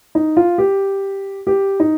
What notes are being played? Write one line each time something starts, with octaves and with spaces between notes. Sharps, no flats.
D#4
F4
G4
G4
D#4